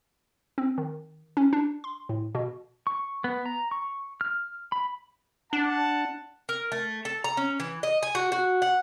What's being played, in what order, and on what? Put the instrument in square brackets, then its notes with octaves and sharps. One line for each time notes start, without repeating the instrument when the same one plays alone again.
[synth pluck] C4
D#3
C#4
D4
C6
A2
B2
[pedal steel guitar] C#6
B3
A#5
C#6
F6
B5
[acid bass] D4 [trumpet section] F#5 A5
[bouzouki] A#4
A3
A4
A#5
C#4
E3
D#5
G#5
F#4
F#4
F#5